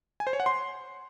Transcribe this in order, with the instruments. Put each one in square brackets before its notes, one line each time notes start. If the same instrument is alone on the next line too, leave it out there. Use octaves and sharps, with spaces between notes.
[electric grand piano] G#5
C5
C#5
F#5
C6